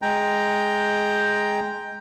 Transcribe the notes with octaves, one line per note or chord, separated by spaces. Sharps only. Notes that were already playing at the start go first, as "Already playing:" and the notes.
G#3 G5 A#5